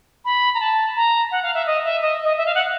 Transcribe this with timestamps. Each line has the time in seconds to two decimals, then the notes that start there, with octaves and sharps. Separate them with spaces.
0.25 B5
0.54 A#5
0.60 A5
0.96 A#5
1.31 F#5
1.43 F5
1.54 E5
1.67 D#5
1.84 E5
2.02 D#5
2.24 D#5
2.37 E5
2.46 F5
2.55 F#5